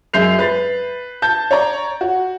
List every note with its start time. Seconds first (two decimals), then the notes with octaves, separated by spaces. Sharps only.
0.13 F#2 G#3 E5 G6 C7 F7
0.39 B4 A6
1.22 A5 G6
1.51 C#5 D5 A#5
2.01 F#4